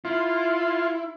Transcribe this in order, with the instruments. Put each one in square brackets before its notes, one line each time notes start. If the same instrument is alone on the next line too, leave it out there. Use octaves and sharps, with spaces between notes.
[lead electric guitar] E4 [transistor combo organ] F4